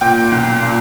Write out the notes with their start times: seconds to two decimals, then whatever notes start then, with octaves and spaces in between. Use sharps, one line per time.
0.01 A#2 G5
0.31 B1
0.63 A#2